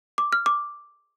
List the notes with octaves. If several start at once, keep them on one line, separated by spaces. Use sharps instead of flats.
D6
F6
D6